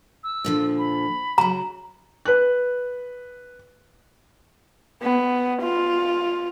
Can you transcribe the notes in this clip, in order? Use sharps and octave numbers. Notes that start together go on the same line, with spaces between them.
E6
A#2 D3 F3
B5
C#3 F#3 A#5
B4 F#6
B3
F4